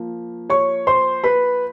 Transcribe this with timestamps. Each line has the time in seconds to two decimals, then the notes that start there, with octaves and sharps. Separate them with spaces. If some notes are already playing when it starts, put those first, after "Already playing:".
Already playing: F3 A#3
0.50 C#5 C#6
0.87 C5 C6
1.24 B4 B5